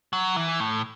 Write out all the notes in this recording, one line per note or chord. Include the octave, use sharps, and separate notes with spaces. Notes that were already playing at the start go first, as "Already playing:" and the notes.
F#3
E3
A2